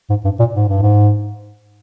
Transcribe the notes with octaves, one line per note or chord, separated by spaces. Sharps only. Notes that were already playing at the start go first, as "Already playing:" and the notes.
G#2
G2
A#2
G#2
G2
G#2